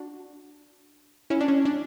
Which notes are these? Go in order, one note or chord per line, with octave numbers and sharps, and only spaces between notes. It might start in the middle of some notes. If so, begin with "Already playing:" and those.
Already playing: D4 F#4
C#4 E4
D4
C#4
D4